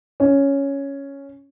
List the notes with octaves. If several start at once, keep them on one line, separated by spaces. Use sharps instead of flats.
C#4